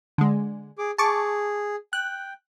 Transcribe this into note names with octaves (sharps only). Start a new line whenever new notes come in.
D3 G#3
G#4 D6
G#4 A5 C#6 D6
G5 F#6